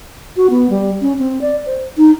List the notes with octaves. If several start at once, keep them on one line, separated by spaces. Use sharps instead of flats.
F#4
B3
G3
C#4
C4
D5
C5
D#4